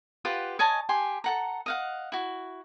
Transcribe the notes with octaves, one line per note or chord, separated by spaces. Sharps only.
F4 G4 B4 F#5
C#5 D#5 G#5 A5
G4 G#5 C6
A4 F#5 A#5
D#5 F5 F#5
E4 F#4